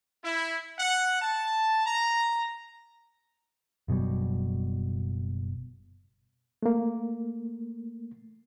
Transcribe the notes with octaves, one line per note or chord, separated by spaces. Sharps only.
E4
F#5
A5
A#5
F#1 B2 F#3 G3
A3 A#3